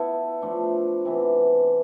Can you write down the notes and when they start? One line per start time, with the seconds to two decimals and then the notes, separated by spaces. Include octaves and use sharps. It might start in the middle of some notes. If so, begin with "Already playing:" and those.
Already playing: B3 E4 A4
0.42 F3 A3 D4
1.05 C3 E3 B3